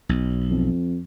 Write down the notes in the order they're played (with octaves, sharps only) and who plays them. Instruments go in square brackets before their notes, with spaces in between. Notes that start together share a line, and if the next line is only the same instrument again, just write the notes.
[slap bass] B1
[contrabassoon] F2